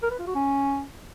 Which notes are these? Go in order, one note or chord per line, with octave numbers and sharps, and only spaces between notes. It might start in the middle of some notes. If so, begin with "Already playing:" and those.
A#4
B4
F4
F#4
C#4